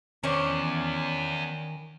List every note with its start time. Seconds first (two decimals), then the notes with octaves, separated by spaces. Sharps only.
0.24 E2 D#3 C#4 D4 C5